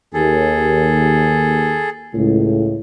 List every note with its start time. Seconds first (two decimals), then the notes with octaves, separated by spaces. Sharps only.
0.14 D#2 G#4 A4
2.14 C#2 A2